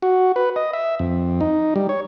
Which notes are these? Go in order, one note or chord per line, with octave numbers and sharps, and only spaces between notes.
F#4
B4
D#5
E5
F2
D#4
G3
C#5